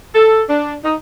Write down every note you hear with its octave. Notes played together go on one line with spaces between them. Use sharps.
A4
D4
D#4